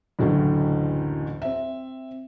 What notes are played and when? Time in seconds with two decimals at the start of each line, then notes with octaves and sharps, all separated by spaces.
0.19 F#1 D2 A2 D3 E3
1.42 C4 E5